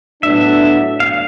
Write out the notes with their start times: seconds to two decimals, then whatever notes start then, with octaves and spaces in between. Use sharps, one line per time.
0.23 A2 F#3 B3 D4 E5
1.00 F5